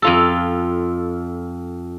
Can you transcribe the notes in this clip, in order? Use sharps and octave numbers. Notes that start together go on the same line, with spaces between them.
F2 F4 A4